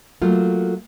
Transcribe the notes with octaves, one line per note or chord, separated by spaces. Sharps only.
F#3 A3 A#3 F4